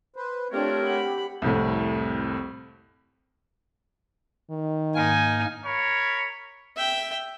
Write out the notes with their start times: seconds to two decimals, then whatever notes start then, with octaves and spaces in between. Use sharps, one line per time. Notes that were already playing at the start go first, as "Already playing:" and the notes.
0.16 B4 C5
0.52 A3 C4 D4 F4 G4 A#4 C#5
0.84 F#5 B5
1.42 C2 F2 A2
4.50 D#3
4.95 G#2 A#3 D#4 G#5 F6
5.65 A#4 C#5 B5
6.76 E5 G5